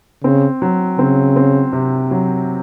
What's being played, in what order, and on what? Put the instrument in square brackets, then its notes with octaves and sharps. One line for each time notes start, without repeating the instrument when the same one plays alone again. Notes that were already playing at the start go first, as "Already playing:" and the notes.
[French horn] C#3 [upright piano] C4
[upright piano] F#3
[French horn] C#3 [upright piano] C4
[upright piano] C4
C3
F#3